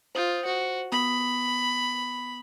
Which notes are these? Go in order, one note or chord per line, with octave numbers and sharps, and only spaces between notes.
F4 C5 D#6 G6
F#4 C5
B3 B5 D#6